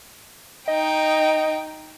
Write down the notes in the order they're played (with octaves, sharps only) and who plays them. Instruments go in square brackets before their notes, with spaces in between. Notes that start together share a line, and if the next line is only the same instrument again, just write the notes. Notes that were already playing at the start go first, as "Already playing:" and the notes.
[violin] D#4 G5 [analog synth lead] D#5